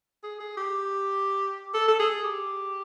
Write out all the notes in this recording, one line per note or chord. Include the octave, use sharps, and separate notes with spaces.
G#4
G#4
G4
A4
A4
G#4
G4